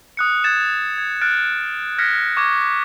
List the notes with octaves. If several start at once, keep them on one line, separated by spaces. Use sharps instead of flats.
D#6 F#6 C#7
F#6 G#6 A6 E7
G#6
F6 F#6 A6 D7
F6 F#6 G#6 A#6 B6 C#7
C#6 D6 G#6